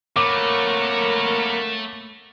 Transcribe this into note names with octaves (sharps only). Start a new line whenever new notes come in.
A3 A#3 A#4 B4 C#5 F#5 D6